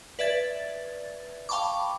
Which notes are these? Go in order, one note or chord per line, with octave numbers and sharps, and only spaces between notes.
B4 D5 E5 G#6 A6
F5 G5 A5 B5 C#6 D6